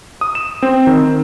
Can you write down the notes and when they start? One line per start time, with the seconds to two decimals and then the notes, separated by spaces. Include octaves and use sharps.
0.21 D#6
0.35 E7
0.63 C4
0.87 D#3